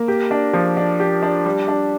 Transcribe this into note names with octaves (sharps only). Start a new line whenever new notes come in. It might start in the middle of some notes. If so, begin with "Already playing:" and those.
Already playing: A#3
G4
D4
F3
D4
G4
D4
G3
D4